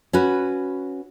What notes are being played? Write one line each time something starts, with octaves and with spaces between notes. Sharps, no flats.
C#4 F#4 B4